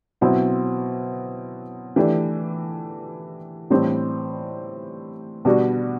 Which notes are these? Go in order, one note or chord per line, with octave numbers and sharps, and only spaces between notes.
B2 F#3 C4 E4
E3 A3 D4 G4
A2 E3 G3 C4
B2 G3 D4 F#4